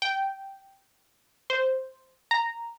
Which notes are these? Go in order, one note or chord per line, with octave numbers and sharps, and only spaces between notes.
G5
C5
A#5